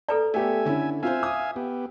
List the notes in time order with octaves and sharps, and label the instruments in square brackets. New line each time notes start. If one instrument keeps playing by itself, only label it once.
[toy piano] A4 B4 D5 [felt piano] A#5
[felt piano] A3 B3 G4 [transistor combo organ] E5 G#5
[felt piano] D3 C#4 E4
[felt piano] C4 F4 C5 [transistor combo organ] E5 F5 G#5
[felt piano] D#6
[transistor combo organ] B3 G4